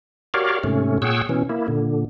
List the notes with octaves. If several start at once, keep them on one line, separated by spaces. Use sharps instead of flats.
F#4 G4 A#4 C#5 D5 F5
G#2 C3 A3 C#4
A#2 G#4 C#5 F#5 G5 E6
B2 E3 C#4
A#3 E4
A#2 D3